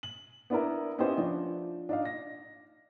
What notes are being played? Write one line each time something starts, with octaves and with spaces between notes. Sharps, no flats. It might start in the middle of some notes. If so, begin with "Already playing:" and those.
F#7
B3 D4 E4 A#4
B3 C#4 D#4 E4 G4 C5
F3 D4
D4 D#4 F5
A#6